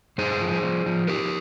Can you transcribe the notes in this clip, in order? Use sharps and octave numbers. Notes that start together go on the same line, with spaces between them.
G2 G#4 C5
F3
F3
F3
G2 G4 A#4